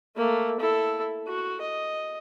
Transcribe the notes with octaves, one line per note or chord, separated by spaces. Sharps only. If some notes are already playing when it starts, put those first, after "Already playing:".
A3 A#3
E4 A4
F#4
D#5